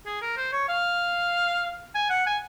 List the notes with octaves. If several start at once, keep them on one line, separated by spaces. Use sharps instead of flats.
G#4
A#4
C5
C#5
F5
G#5
F#5
G#5